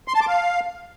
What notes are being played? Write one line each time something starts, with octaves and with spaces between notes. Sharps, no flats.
C6
A5
D6
F5